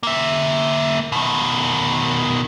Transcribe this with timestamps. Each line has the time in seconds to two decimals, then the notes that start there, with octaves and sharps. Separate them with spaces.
0.03 A#3 E5
1.12 B2 D#3